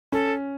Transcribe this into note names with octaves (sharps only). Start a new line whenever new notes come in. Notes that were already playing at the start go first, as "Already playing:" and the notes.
C#4 A4